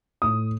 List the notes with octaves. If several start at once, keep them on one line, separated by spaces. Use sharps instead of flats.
A2 D#6